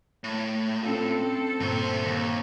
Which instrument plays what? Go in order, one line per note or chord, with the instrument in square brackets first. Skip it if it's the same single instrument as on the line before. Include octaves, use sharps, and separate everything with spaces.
[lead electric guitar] A2
[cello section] C4 A4 [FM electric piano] C#4 F4
[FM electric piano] G2 A#2 [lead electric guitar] D3 C5
[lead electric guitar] D#2